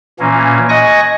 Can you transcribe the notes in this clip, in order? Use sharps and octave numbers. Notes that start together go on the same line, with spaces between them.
A#2 E3 A#3 C#4
D#5 G#5 C#6 D#6 F#6 A#6